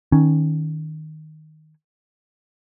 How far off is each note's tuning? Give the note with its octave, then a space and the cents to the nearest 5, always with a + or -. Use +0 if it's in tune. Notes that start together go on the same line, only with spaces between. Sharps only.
D#3 +0 C#4 +0